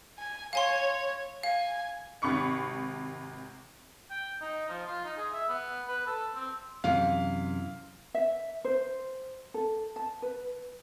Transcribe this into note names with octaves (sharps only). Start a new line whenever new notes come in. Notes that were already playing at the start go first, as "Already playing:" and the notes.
G#5
C#5 F5 G#5 C6
F5 G#5
G#1 C3 B5 C#6 C#7
G5
D#4
F3
F4
D#4
G#4
E5
B3
B4
A4
C4
F#2 C3 E3 F5
E5
C5
A4
A5
B4